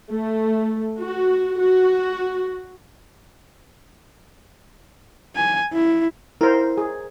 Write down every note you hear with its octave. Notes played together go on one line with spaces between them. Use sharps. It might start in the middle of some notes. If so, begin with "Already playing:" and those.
A3
F#4
F#4
G#5
E4
E4 A#4 C5
G#4